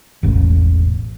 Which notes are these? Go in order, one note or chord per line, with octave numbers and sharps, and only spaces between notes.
E1 A1